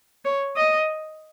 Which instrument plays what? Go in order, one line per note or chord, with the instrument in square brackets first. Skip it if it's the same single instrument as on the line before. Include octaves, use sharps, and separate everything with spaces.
[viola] C#5
D#5